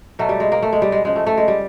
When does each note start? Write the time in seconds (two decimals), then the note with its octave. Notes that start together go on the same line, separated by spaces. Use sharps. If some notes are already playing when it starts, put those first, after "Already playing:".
0.19 B2 F#3 A3
0.29 G3
0.40 G#3
0.52 A#3
0.62 A3
0.73 G#3
0.82 G3
0.92 G#3
1.05 C#3 F3 G#3
1.16 A3
1.27 A3
1.37 G#3
1.48 G3